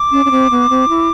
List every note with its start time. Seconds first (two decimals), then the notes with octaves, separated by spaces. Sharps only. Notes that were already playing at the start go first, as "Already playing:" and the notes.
Already playing: D6
0.12 C#4
0.25 C#4
0.31 C4
0.50 B3
0.69 C4
0.89 E4